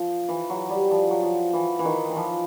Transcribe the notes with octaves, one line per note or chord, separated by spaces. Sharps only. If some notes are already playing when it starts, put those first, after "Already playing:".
Already playing: F3
E3
F#3
G3
F3
F#3
F3
E3
E3
D#3
E3
F3